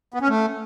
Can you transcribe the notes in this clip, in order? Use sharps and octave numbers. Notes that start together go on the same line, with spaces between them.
B3
C#4
A3